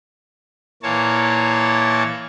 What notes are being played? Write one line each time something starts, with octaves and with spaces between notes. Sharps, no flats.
A#2 E3 A#3 C#5 A5